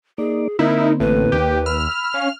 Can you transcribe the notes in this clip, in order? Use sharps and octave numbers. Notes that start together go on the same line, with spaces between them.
A#3 D#4 G#4 D5
D3 A#3 C4 D#4 E4 A#4
A1 A2 B4
D#2 G4
B5 E6 F6
C#4 F5